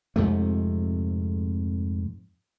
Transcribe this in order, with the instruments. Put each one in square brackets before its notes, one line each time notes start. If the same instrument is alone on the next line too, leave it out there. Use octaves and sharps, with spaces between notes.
[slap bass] F2 G#2 C3 A3